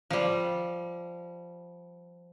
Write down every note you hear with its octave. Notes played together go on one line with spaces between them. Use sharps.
F3 G3